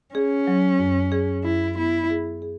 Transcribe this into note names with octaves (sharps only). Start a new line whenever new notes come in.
C#4 G#4
F#3
F#2
G#4
F#2 E4
B3 E4
G#4
G#4